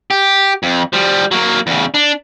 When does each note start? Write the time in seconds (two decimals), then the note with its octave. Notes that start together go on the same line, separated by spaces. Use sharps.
0.10 G4
0.63 F2
0.93 F3 G3
1.31 F#3 A#3
1.67 E2 C#3
1.94 D4